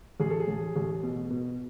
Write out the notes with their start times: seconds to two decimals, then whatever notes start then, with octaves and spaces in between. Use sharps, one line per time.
0.20 A1 G#4
0.30 A4
0.40 G#4
0.48 A1
0.76 A1
1.03 B2
1.30 B2